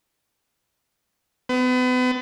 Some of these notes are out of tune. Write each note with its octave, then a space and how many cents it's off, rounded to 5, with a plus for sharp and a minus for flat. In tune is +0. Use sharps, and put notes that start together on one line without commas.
B3 +35